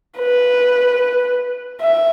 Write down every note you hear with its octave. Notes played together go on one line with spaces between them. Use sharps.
B4
E5